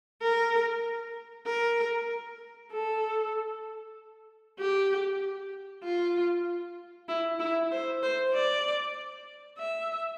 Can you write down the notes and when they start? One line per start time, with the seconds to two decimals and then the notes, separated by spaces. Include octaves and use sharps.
0.22 A#4
1.46 A#4
2.71 A4
4.59 G4
5.84 F4
7.08 E4
7.39 E4
7.71 C5
8.03 C5
8.34 D5
9.58 E5